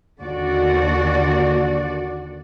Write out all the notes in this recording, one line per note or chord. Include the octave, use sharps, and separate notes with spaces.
D#2 D3 F#4 D5